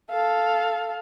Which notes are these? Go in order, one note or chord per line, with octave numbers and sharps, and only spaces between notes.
A4 F5